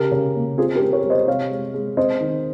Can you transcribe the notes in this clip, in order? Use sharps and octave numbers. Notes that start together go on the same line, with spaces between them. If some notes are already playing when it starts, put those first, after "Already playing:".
Already playing: C#3 G4 A#4
C#3
A#3
C4 F4 G#4
G4 A#4
C4
A#4 C#5
G3
C5 D#5
C3 C#5 F5
G#3
G#3
C4 C5 D#5
D#3